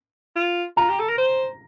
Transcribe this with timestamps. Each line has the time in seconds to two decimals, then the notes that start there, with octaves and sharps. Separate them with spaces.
0.36 F4
0.77 F4 A#5
0.90 G4
1.00 A4
1.09 A#4
1.18 C5